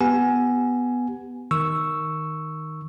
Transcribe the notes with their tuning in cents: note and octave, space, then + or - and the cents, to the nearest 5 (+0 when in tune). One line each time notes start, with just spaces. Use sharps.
B3 +0 G4 +0 G#5 +10
D#3 +0 C#6 +0 E6 +0